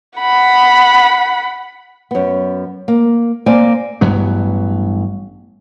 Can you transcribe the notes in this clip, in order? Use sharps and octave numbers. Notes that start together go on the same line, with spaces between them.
F#5 B5
F#2 B3
A#3
A#3 C4 D5 G#5
A1 G2 F#3 B3